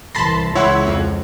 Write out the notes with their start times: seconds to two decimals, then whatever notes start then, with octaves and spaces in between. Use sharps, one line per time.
0.15 C2 E3 A5 B5 C6 A#6
0.55 C#2 E4 C#5 F#5 C6
0.87 F2